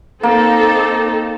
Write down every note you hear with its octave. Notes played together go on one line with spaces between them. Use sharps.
A#3 C4 D#4 A4